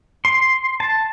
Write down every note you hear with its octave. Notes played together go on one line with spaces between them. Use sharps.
C6
A5